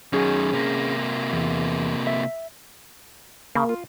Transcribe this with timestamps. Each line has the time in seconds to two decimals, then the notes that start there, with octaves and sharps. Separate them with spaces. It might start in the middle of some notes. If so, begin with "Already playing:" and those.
0.13 F#2 D#3 C#4 G#4
0.53 C3 A#3
1.33 E2
2.07 E5
3.55 C#3 A#3
3.69 F4